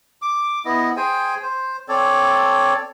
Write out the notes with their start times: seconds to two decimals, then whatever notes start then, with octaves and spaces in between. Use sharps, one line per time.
0.22 D6
0.65 B3 E4 D#5
0.97 G#4 C5 G5 G#5
1.42 C5
1.88 C4 A4 C#5 D5